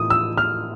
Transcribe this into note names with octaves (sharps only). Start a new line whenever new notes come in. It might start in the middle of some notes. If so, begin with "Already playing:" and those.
Already playing: A2 E3 D#6
E6
F6